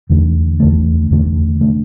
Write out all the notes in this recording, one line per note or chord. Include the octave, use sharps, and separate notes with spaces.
E2 D3 A3
E2 D3 A3
E2 D3 A3
D3 A3